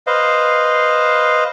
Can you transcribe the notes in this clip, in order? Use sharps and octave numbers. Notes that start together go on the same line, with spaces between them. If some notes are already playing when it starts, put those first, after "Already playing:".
B4 C5 D#5 F5